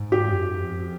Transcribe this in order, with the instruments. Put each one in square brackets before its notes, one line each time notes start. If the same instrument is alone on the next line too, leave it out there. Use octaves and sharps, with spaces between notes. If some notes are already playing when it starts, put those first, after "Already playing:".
Already playing: [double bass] G#2
[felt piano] G4
[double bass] F#2
F2